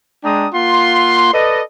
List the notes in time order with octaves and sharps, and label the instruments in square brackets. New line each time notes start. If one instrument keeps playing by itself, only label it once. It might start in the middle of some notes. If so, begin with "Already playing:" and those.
[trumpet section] G#3 D4 G5 A#5 D#6
A#3 F4 F#5 C6
A4 B4 D5 D#5